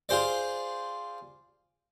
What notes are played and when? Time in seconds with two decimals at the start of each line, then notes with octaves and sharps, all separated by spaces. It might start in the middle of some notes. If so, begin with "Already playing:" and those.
0.09 F4 G#4 C5 D5